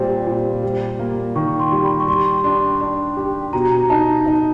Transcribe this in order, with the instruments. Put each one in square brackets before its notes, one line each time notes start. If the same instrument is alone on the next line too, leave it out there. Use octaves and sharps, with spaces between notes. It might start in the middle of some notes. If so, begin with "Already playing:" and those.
Already playing: [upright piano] A#2 G3 C4
A#2
G3
A#3
[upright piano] D#3 [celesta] C#6
[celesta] C6
[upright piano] G3
[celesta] B5
C#6
[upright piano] G3 [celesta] C6
[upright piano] D4 [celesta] C6
[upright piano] D4
G4
[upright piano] B2 [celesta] A#5
[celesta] A#5
[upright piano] D#4 [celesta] A5
[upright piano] D#4